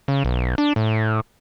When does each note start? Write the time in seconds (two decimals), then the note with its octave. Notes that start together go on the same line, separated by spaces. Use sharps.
0.08 C#3
0.25 B1
0.58 D4
0.76 A2